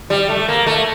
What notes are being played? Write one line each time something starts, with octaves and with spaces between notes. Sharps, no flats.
G3
A3
A#3
A3